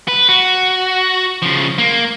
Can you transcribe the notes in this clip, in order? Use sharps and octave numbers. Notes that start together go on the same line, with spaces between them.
B4
F#4
C#3 F3
A#3